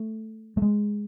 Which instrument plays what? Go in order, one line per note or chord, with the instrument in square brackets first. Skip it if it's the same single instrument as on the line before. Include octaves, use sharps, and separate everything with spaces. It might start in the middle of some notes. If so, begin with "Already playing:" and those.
Already playing: [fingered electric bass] A3
A3
G#3